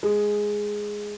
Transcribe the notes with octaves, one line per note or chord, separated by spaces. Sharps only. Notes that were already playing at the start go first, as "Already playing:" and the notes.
G#3